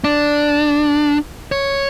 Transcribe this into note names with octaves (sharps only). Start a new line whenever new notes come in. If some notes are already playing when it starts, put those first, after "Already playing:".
D4
C#5